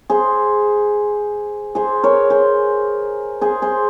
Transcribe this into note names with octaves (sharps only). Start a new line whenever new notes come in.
G#4 C5
G#4 C5
A#4 C#5
G#4 C5
G#4 C5
G#4 C5